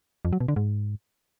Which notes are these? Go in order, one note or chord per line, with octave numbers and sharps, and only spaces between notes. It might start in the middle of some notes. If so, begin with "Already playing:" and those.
F2
F#3
B2
D3
G#2